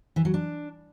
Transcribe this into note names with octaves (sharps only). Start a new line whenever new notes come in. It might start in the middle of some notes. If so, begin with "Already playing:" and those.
E3
F#3
D4